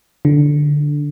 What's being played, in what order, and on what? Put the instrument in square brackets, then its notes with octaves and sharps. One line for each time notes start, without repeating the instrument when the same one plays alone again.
[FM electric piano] D3